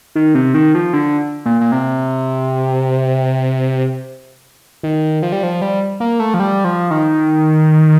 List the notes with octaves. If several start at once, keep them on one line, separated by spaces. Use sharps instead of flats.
D#3
C3
D#3
F3
D3
A#2
A#2
C3
D#3
F3
G3
F3
G3
A#3
A3
F3
G3
F3
D#3